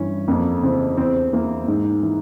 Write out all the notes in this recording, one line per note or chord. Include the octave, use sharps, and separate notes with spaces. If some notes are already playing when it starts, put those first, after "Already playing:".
Already playing: G2 E3 C#4
F2 A#3
C#3 E3 C4
E2 C4
E3 A#3
G#2
E3